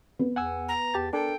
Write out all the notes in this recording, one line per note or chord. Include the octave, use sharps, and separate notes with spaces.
B3
E2 F#5 G#5 E6
A#5
E2 G4 A5 A6
D4 A4 A#4 G5